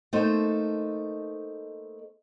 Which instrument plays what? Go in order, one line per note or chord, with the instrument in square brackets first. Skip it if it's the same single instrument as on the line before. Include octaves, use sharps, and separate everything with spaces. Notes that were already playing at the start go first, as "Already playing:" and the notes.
[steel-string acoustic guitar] A3 A#3 D#4 A4 C5